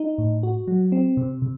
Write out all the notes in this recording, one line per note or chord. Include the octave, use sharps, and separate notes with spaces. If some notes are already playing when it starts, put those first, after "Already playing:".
Already playing: D#4
A2
F#4
F#3
C4
C3
C3